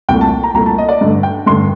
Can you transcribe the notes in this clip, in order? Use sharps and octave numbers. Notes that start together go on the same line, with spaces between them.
C2 A#2 A3 G5
A5
A#5
C2 A#2 A3 A#5
A5
D#5
D5
G2 D3 A3
G5
G2 D3 A3 C6